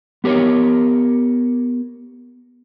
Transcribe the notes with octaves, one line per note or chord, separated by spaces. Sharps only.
B3 G4 A#4 C#5